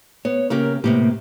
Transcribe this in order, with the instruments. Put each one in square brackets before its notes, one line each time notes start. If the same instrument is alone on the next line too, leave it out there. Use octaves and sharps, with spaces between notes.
[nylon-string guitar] B3 [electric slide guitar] C#5
[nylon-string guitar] C#3 A#3 G4 [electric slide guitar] A#4
[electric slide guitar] A2 A#3 [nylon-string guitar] C3 B3 G4